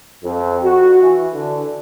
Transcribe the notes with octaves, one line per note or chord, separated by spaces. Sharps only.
F2
F#4
E3
D3